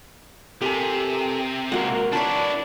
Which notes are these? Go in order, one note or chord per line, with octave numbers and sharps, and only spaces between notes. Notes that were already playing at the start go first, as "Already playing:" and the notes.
C3 G4 A4 A#4 G#5
G#3 A#3 F#4 A#4 F#5
D4 E4 B4 C#5 D5 A5